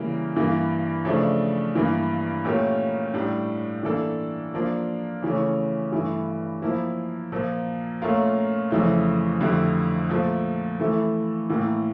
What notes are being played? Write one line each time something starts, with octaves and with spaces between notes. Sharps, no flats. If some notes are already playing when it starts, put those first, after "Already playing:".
Already playing: C#3 E3 G3 A#3
G2 E3 A#3
C#3 F3 A3 D4
G2 E3 A#3
A#2 A3 C#4 G4 A#4
A2 G3 D4 G4
E3 A#3 D4 A4
F3 A#3 D4 F4
C#3 E3 A3 C#4
G2 E3 A3
F3 A#3 E4
A#2 F3 A#3
A#2 A3 C#4 F4 A#4
F2 C#3 E3 A3
F2 D3 A3 E4 G4
A#2 F3 A3
E3 A3 E4 A4
A2 E3 A#3